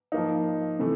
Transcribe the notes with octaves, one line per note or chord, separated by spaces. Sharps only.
F3 A#3 D#4
C3 E3 A3